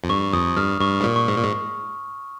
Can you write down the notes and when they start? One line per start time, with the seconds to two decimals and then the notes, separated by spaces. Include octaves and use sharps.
0.04 F2
0.09 G2 C#6
0.33 F2 D#6
0.57 G2 F6
0.80 G2 C#6
1.01 G#2
1.04 A#2
1.16 C#6
1.28 G#2
1.36 A#2
1.43 G#2